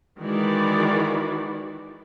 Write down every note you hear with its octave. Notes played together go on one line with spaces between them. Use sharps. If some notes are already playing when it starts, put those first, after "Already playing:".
D#3 E3 G#3 F#4 D5